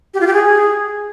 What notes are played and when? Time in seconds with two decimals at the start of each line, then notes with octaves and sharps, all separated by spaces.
0.14 G4
0.20 F4
0.27 G4
0.33 G#4